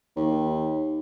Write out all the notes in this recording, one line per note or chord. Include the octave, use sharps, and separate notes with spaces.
D#2